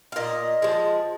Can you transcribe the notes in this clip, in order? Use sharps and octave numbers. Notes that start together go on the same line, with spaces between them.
F5
A#2 D#5
F3 G#3